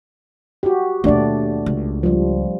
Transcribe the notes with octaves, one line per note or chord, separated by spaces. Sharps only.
F#4 G4
D#2 B2 A3 D4 D5
C#2
F3 G3